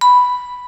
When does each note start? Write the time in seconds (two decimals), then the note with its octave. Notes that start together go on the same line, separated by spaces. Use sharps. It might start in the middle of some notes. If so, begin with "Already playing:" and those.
0.01 B5